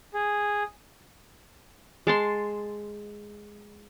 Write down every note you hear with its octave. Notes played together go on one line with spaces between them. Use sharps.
G#4
G#3 A5 C6